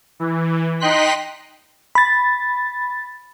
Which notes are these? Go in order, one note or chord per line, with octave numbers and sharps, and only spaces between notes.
E3
D#4 D#5 G5 C6 F#6 B6
B5 A6